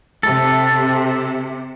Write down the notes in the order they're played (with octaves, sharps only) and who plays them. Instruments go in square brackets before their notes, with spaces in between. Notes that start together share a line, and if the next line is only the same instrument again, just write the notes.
[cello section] C3 [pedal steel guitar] A4